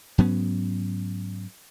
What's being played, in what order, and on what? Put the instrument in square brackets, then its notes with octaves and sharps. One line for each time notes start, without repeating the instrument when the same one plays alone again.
[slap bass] G#2 F#3 B3 C#4